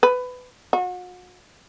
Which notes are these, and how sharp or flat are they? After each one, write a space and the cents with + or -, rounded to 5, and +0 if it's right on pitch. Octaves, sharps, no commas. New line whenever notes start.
B4 +20
F#4 -40